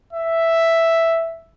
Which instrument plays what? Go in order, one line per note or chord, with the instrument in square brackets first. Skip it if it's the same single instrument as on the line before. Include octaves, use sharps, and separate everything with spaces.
[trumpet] E5